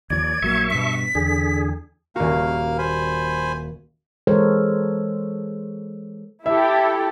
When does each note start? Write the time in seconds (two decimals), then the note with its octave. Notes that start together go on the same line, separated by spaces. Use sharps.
0.10 D#2 E3 F3 D5 G#6
0.42 A#1 F#3 A#3 E5 C#6
0.71 G2 B2 B6
1.15 E2 D3 G#4
2.16 D#1 A#3 F#4 F5
2.78 C5 G#5 B5
4.27 E3 G#3 A4 A#4 C5 C#5
6.46 E4 G4 A4 E5